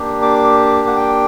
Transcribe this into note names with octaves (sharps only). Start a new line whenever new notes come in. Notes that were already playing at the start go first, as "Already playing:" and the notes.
Already playing: A#3 D4 G4
D6
F#5
G5